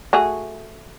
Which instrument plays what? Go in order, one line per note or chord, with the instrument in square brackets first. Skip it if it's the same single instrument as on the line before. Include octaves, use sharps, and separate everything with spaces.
[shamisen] A3 F#4 G#4